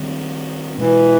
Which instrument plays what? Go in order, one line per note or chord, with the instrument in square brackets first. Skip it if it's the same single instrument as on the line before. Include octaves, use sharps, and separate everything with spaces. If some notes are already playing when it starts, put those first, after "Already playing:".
Already playing: [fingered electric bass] D#3 G3 C4
[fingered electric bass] B2 G#3 C#4 [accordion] E3